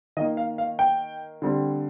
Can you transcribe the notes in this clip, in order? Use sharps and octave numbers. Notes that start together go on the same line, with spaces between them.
D#3 A#3 D#5
F5
F5
G5
D3 G3 C4